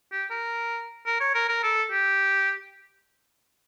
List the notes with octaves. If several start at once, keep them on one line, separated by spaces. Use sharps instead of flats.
G4
A#4
A#4
C#5
A#4
A#4
A4
G4